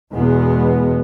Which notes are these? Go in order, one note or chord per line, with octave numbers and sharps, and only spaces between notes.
E2 B2 G#3 B3